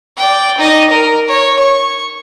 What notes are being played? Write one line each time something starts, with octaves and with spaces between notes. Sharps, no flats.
D5 G5
D#4 D#5
A#4
C#5
C#6